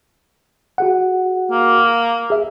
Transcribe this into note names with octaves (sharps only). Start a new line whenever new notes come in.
F#4 G#4 F#5
A#3
G#4 E5